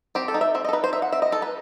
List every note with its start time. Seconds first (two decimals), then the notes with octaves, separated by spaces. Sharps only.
0.15 C4 G4
0.28 A4
0.34 D#4
0.41 E5
0.55 C4 E5
0.65 A4 D#5
0.73 D#4 B4
0.84 C5
0.93 D#4 E5
1.02 F#5
1.12 C4 E5
1.22 D#5
1.32 D#4 A4
1.42 B4